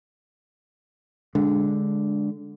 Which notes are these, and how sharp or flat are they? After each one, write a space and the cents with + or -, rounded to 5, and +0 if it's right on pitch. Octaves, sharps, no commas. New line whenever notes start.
D3 -10 G#3 -5 D4 +0